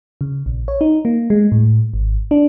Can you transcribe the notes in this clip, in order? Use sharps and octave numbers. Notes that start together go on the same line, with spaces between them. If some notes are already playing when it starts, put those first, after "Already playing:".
C#3
A#1
C#5
D#4
A#3
G#3
A2
G#1
D4